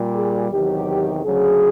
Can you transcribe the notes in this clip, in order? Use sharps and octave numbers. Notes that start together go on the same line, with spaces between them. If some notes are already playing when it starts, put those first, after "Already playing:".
Already playing: A#2 G3
G#4
E2 C3 D#3 F#3 G4
D2 C#3 F#3 G#4